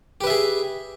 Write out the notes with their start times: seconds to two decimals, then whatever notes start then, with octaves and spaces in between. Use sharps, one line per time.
0.21 G4
0.24 B4
0.27 E5
0.30 G#4